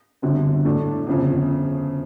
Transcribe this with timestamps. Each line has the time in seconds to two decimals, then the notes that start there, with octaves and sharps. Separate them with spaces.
0.22 G1 F#2 D3 G3 C4
0.65 A2 F#3 A3 D4
1.07 G1 F2 C#3